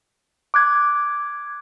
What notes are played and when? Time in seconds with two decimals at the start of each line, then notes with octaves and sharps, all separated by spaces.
0.54 D6 F#6 G#6